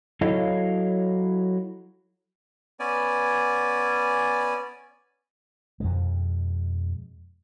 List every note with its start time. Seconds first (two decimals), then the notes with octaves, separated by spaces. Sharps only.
0.21 F#3 E4 A4 C#5 D#5 F5
2.80 B3 C#4 D5 G#5
5.80 F2 B2 G#3